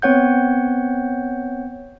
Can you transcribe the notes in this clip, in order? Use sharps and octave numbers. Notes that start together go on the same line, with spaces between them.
B3 C4 C#5 F#5 G6